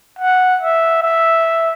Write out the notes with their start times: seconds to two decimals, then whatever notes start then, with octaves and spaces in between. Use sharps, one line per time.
0.19 F#5
0.61 E5
1.02 E5